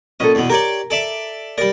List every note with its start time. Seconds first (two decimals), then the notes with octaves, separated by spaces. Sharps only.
0.20 A#1 C#4 A4 D#5
0.35 E2 B2
0.49 G4 A#4 C#5 D5
0.90 A4 D5 E5
1.58 G3 A#4 D5